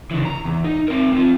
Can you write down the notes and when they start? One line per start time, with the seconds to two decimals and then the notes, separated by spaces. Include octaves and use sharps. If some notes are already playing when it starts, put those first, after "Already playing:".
0.11 C#3 E3
0.25 A#5
0.45 E2
0.65 D#4
0.88 C4 A#4
1.13 C4 F4